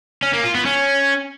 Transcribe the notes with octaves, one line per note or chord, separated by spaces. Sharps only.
C#4
A#3
F4
B3
C#4